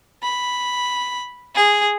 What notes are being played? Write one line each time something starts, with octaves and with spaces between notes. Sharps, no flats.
B5
G#4